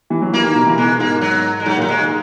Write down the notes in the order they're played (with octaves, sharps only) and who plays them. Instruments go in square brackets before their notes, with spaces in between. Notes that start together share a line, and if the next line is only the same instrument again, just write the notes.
[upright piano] E3
F#3
[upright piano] E3 [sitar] A#3
[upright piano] D#3
B2
E3
[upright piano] B2 [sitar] G#3
[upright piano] G#2 [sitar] A#3
[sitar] F#3
G#3
[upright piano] G#2 [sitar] F#3
[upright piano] A#2
[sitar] F#3
G#3
[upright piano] D#3